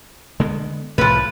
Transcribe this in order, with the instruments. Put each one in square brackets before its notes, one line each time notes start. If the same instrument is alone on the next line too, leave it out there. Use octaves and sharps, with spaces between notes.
[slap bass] D3 G#3 B3
[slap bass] C2 A2 [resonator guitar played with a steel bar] F3 B4